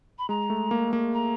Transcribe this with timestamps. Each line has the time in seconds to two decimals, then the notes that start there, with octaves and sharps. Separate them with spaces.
0.18 B5
0.29 G#3 A#5
0.50 A3
0.71 A#3
0.93 A#3
1.14 A#5